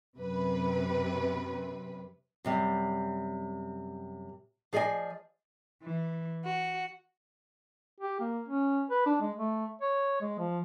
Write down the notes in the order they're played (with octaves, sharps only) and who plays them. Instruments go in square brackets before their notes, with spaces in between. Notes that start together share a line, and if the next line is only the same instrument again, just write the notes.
[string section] F#2 C3 B4
[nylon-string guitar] F#2 C3 G3
F3 G#4 D5 D#5 G#5
[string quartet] E3
F#4
[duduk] G4
A#3
C#4
B4
D4
G#3
A3
C#5
G#3
F3